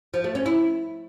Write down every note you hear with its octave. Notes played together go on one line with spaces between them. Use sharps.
F3
A3
C#4
E4